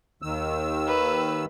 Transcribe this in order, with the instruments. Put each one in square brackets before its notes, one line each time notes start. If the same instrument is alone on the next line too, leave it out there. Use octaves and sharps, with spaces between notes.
[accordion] D#2 D#3 E6
[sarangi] B4